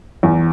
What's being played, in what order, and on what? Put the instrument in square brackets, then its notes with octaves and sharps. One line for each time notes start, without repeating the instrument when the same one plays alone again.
[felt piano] E2